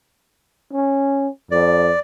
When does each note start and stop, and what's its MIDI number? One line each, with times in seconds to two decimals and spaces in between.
0.73 1.28 61
1.51 1.92 41
1.51 1.99 74